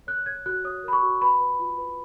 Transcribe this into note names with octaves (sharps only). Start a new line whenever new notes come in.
C#5 F#6
C#5 G#6
F#4 F#6
C#5 D#6
A#4 B5
C#6
F#4
B4 B5
B4
F4
B4